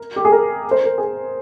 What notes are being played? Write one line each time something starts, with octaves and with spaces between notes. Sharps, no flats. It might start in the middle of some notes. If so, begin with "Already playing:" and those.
Already playing: A#4
G4
G#4
A#4
C5
A#4
G#4